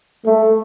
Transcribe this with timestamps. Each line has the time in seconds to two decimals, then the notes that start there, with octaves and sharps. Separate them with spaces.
0.25 A3